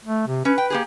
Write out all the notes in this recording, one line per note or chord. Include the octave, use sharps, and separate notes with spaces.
A3
C3
C#4 B4
G5
A#3 G4 G#4